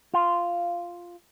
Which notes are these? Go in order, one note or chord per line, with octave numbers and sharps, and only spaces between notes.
F4